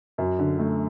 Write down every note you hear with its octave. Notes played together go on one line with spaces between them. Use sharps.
F#2
D3
A3